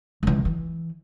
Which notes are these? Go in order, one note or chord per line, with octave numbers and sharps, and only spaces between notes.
C#2 E3
E3